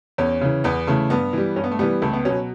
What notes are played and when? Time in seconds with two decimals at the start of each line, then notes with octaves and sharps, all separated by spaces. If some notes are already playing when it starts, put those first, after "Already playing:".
0.18 E2 C#4
0.41 C#3 E3
0.64 E2 B3
0.87 C#3 E3 A3
1.10 G2 B3
1.33 E3 G3
1.56 G2 C#4
1.64 B3
1.71 A3
1.79 E3 G3 B3
2.02 C#2 A3
2.13 B3
2.25 B2 F#3 C#4